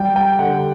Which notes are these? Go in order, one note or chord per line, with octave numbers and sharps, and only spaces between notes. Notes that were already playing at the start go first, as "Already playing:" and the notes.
Already playing: G3 G5
G5
D3 F#5